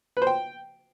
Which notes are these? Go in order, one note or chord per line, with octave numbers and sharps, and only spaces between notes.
B4
C5
G5